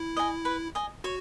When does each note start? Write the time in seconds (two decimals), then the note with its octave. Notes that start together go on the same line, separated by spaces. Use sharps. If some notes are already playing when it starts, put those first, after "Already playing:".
Already playing: E4
0.17 D#5 G#5
0.45 B4
0.75 D#5 G#5
1.04 F#4 C#5